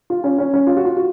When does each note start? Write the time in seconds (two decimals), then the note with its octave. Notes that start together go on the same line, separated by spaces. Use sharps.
0.10 F4
0.24 C#4
0.38 C#4
0.54 C#4
0.67 F4
0.77 F#4
0.85 F4
0.97 F#4